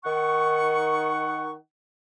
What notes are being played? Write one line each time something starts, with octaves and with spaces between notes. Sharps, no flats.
D#3 F#5 C#6